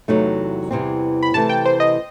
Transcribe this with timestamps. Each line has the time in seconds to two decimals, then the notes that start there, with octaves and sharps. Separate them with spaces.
0.08 E2 C3 F#3 A3 D#4
0.71 E2 C3 E3 G3 C4
1.23 B5
1.34 C3 E3 A3 A5
1.49 G5
1.65 C5
1.80 D#5